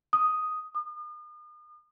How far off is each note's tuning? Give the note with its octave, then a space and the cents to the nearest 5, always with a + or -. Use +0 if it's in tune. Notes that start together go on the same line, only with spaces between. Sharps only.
D#6 +0
D#6 -40